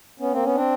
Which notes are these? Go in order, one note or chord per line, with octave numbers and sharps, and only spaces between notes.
B3 C#4
A#3 C4
B3 C#4
C4 D4